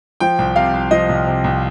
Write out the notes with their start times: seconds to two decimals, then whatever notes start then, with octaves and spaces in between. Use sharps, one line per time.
0.20 F3 G5
0.38 C2
0.56 C3 F5
0.74 C2
0.91 F3 D#5
1.09 C2
1.27 C3
1.44 C2